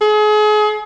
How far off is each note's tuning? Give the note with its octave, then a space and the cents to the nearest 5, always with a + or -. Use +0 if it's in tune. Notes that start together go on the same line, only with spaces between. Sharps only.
G#4 +35